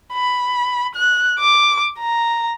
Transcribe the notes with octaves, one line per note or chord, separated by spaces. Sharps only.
B5
F#6
D6
A#5